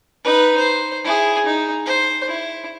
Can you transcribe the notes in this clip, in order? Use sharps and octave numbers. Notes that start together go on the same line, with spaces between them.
D#4 B4
C5
E4 G#4
D#4
C5
E4